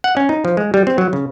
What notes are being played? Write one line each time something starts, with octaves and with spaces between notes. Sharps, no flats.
F#5
C#4
D#4
F3
G#3
G3
C4
F#3
C#3